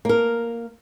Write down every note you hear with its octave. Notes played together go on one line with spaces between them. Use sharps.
A#3 A#4